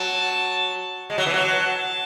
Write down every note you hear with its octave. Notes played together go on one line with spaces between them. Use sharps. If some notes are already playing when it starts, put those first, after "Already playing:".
Already playing: F#3 A5
G#3 A5
F#3
E3
F#3